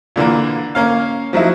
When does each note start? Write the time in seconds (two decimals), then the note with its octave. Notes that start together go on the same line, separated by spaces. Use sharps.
0.16 A#2 D3 E3 A#3
0.75 A#3 C#4 F5
1.33 F3 F#3 D#4 E4